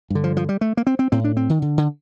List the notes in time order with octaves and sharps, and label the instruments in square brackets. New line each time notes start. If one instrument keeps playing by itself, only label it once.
[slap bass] G2 D3
F3
F3
G3
A3
A#3
C4
C4
A2 C4
D4
C4
D#3
D3
D3